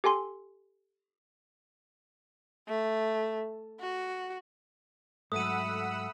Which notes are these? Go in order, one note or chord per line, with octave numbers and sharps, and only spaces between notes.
G4 A4 G#5 C6
A3
F#4
G#2 F#3 A3 F#5 B5 D#6 E6 D#7